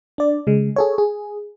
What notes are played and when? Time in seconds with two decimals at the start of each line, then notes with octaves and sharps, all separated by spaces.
0.18 D4 D5
0.47 C#3 G#3
0.76 G#4 A4 C#5
0.98 G#4